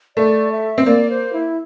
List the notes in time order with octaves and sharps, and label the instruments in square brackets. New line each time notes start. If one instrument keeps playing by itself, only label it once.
[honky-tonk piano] A3 [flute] D5
[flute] E5
[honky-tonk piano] C4
[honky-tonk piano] A#3 [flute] D5
[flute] C5
E4